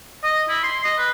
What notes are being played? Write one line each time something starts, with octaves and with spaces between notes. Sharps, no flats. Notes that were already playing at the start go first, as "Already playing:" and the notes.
D#5
E4
C6
D#5
B4